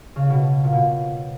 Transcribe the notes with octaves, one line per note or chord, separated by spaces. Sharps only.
C#3
B2
A#2
B2